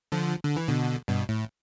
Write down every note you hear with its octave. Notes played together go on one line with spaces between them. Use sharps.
D3 F3
D3
E3
B2 D3
G2 B2
A2